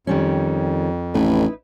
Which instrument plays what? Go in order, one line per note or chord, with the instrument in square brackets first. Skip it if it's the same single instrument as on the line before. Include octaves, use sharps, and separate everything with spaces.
[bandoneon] F2 [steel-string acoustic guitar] D#3 G3 C#4
[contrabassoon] A1 [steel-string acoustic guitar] D#4 E4 B4